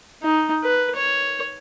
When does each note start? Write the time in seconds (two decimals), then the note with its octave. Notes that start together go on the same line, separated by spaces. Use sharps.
0.22 D#4
0.63 B4
0.96 C#5